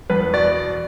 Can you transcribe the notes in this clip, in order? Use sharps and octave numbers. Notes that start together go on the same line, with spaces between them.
E2 B4
B2 D5